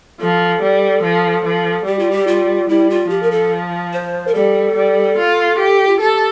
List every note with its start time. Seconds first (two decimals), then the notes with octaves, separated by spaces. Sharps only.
0.20 F3 A4
0.62 G3
1.03 F3
1.45 F3
1.86 G3 G4
1.99 F4
2.11 G4
2.27 F4
2.69 G3 E4
2.90 F4
3.10 F3 G4
3.22 A#4
3.31 A4
3.93 C5
4.28 A#4
4.34 G3 A4
4.76 G3
5.18 F4
5.59 G4
5.88 F4
6.00 G4 A4